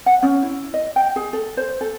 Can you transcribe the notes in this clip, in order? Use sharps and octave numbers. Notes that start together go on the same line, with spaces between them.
F#5
C#4
E4
D#5
G5
G#4
A4
C5
A4